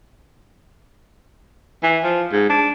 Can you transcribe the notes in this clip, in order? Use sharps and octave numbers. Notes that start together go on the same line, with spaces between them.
E3
F3
G#2
D4